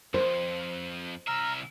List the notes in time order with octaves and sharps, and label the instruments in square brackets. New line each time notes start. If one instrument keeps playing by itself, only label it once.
[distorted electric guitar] F2 [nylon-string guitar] C5
[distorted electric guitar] C2 E5 [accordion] A#5 F6